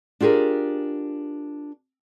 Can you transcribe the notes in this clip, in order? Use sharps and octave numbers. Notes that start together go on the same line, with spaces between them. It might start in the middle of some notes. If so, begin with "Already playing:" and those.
D4 F4 G4 G#4 A#4